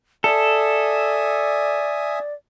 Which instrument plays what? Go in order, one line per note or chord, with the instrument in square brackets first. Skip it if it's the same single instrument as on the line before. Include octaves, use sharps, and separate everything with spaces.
[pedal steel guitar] A4 [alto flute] D5 [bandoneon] E5 G#5 D#6